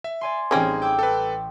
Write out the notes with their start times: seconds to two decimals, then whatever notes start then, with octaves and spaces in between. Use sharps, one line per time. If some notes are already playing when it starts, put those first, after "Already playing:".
0.04 E5
0.21 D5 G#5 C6
0.51 A1 G3 C4 C#4 D#4 G#4 F6 G#6
0.82 G5 D6 E6
0.99 A4 B4